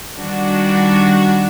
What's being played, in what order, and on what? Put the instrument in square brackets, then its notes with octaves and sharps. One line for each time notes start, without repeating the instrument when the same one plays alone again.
[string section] D#3 G3 D4 F#4